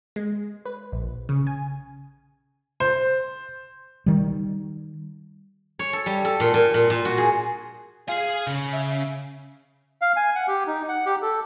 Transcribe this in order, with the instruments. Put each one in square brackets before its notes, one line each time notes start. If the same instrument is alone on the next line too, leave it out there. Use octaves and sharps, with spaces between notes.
[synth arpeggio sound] G#3
B4
A#1
C#3
G#5
[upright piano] C5
[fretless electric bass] D#3 G3
[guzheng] C#5
A4
G3
A4
A#2
A#2
A#2
A#2
F#4
G#4
[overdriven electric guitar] G#4 G#5 [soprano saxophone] F5
[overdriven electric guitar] C#3
[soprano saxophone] E5
[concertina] F5
G#5
F#5
G4
D#4
F#5
G4
A4